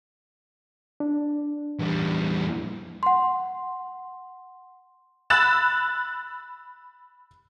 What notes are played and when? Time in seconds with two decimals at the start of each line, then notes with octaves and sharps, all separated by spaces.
1.00 D4
1.79 E2 G3
3.03 F#5 C6
5.30 B5 E6 F#6 A6 E7